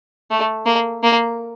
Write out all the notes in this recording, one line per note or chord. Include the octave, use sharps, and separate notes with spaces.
A3
A#3
A#3